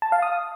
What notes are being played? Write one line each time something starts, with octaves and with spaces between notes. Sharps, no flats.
A5
F5
D#6